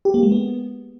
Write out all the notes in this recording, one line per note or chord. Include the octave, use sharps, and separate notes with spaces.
G4
A#3
G#3
B3